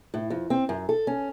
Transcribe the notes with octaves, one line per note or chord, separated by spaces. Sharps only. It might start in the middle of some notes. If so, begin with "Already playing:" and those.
A2
F2
C4
F#2
A4
C#4